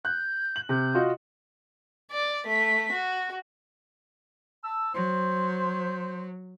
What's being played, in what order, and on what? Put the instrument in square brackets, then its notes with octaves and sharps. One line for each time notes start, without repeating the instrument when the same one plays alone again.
[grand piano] F#6 [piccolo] G6
[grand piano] F#7
[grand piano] C3 [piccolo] G6
[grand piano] F4 F#4 D#5
[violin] D5
A3 B6
F#4
[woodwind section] A5 E6
[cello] F#3 [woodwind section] C5